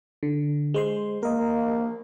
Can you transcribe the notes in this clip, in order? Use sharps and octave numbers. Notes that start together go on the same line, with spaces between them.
D3
G#3 C5 C6
A#3 A#4 D#5